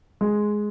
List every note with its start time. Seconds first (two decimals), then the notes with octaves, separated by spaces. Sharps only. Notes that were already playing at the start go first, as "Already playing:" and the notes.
0.21 G#3